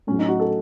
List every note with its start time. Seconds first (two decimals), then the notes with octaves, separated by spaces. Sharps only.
0.07 A2 C#4
0.12 F#3
0.19 D#4
0.28 F#4
0.40 A4